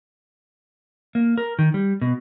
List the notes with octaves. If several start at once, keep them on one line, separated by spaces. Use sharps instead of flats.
A#3
A#4
D#3
G3
B2